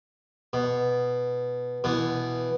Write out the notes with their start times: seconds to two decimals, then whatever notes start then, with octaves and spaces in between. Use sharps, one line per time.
0.53 B2
1.84 B2 E3